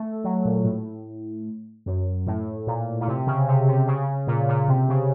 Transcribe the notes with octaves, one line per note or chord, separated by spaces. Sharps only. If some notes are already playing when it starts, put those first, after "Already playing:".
Already playing: A3
F#3
A#2
A2
F#2
A2
A#2
A#2
C3
C#3
C3
C3
C#3
A#2
A#2
C3
C#3